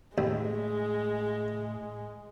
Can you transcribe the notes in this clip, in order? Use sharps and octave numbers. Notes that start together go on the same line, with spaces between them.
D#2 A2 G#3